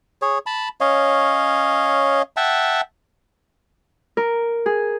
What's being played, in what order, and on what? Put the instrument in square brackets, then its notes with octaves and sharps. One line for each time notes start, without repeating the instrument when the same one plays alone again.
[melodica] G#4 C#5
A5 B5
C#4 C#5 D#5 F5
E5 F#5 G5 A5
[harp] A#4
G#4